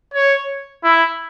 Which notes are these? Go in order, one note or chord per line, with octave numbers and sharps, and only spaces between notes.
C#5
E4